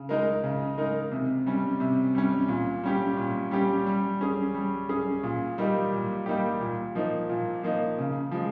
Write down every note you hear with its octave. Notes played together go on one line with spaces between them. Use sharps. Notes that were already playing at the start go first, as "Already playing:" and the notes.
Already playing: C#3
G#3 D#4 A#4
C#3
G#3 D#4 A#4
C3
G3 C#4
C3
G3 C#4
A#2
G3 C#4 G4
A#2
G3 C#4 G4
G3
C#4 G#4
G3
C#4 G#4
A#2
G3 A#3 D#4 G4
A#2
G3 A#3 D#4 G4
A#2
F3 A#3 D#4
A#2
F3 A#3 D#4
C#3
F3 G#3